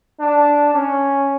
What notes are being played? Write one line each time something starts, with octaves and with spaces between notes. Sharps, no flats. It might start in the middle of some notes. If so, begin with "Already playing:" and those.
D4
C#4